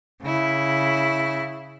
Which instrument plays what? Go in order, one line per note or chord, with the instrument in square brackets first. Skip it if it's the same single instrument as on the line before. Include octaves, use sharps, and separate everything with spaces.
[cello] C#3 E4